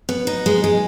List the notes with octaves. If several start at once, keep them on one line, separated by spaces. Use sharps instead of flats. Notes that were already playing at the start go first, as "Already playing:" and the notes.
B3
D#4
G#3
G#3